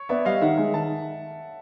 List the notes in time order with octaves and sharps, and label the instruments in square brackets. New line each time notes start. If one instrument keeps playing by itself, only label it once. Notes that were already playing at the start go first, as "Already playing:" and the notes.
Already playing: [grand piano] C#5
[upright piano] B3 [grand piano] D5 E5
[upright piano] G3 [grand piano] D#5 F5
[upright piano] D#3 [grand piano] E5 F#5
[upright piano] G#3
[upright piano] D#3 [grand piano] A5